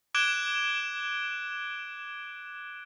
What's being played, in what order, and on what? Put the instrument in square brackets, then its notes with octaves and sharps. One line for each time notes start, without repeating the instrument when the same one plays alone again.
[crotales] D6 F#6 G#6 D7 E7 G7